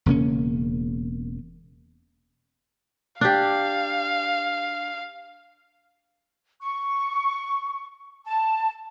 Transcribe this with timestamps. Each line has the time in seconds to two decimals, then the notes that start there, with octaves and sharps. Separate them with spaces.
0.06 E1 C#3 A#3 C#4
3.21 D4 G4 F5
6.61 C#6
8.26 A5